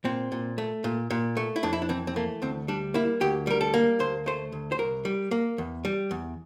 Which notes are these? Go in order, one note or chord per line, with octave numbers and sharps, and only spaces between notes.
A#2 C4
A#2
A3
A#2
A#2
A3
E4
F2 D4
E4
D4
E3 C4
C4
A3 A#3
D2 C4
G3 D4
A#3 E4
D2 G4
G3 A#4
A4
A#3
D2 C5
A3 C5
D2
C5
C2 A#4
G3
A#3
E2
G3
E2